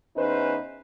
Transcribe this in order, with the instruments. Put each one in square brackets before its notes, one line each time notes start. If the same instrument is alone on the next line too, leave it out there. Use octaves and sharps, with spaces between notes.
[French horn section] E2 C#4 D#4 B4 C5